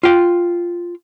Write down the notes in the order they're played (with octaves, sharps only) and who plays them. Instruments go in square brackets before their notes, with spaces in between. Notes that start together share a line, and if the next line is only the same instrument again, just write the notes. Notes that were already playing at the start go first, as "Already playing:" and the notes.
[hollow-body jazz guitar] F4 G5